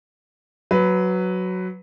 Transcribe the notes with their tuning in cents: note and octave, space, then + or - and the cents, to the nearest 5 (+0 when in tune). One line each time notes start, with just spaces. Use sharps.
F#3 +0 B4 +10